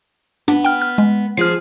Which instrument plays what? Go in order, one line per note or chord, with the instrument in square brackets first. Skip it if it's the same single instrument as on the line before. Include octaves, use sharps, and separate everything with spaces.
[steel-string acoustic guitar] B3 [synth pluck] D4
[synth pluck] G5 F6
F6
G#3
[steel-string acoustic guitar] F3 G#4 [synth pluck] F6 C7